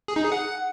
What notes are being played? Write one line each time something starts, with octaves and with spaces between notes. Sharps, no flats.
G#4
D#4
G#4
F#5